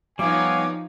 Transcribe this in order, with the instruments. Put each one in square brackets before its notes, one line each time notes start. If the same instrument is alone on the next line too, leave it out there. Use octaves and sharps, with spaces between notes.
[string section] F3 D#4 [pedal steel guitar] G3 B3 [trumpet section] C#5 F5 G#5 [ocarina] D6